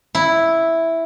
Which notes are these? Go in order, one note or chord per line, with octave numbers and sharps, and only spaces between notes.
E4